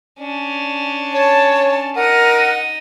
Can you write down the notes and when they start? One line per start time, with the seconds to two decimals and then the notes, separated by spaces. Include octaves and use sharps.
0.19 C#4 D4
1.13 C#5 A5
1.96 D#4 A#4 F#5 D#6